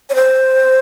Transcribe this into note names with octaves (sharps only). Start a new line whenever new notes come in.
C#5
C5